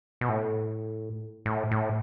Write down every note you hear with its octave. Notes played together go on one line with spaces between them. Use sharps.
B2
A2
A2
A2